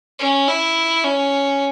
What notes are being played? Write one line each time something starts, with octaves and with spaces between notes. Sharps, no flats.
C#4
E4
C#4